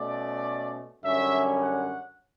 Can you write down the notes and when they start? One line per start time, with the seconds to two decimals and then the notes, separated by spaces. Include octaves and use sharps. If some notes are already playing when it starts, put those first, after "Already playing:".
Already playing: B2 A3 C#4 D5
1.02 F#2 D3 G3 C#4 E5
1.59 F#5